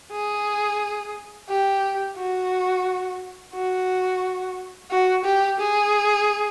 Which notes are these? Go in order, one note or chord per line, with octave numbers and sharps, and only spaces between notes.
G#4
G4
F#4
F#4
F#4
G4
G#4